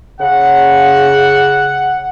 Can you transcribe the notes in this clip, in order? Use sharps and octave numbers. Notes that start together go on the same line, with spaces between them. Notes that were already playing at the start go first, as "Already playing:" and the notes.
C#3 F#5